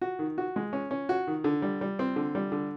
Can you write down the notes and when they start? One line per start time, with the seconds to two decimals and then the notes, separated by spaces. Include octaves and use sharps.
0.02 F#4
0.19 D#3
0.38 F#4
0.56 G#3
0.73 C#4
0.91 C#4
1.09 F#4
1.27 D#3
1.44 D3
1.62 G3
1.81 G3
1.99 C4
2.16 D3
2.35 G3
2.52 D3